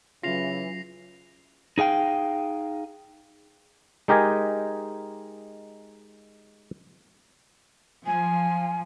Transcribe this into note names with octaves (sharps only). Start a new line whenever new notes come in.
C#3 E3 F#3 C#4 F4 A#6 C7 F7
D#4 G#4 F5 G5
G#3 D#4 G4 A#4 D#5 G#5
F3 G#5